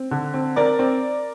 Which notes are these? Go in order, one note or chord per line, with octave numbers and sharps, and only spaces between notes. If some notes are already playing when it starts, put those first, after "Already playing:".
Already playing: C4
D3
C4
C4 A#4 D5
C4